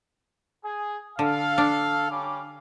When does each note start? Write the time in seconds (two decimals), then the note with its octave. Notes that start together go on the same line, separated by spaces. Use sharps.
0.64 G#4
1.19 D3 A4 F5
1.58 D4
2.11 G3 C#4 D6